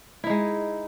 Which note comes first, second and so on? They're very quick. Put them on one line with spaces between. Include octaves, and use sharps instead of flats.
E4 D#4 G#3